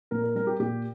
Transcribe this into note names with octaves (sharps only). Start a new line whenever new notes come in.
A#2 A#4
A#4
G3 A#4
G4
A#2 G4